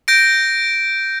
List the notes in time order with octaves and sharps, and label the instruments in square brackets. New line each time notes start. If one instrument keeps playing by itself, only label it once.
[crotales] G6 A#6 D7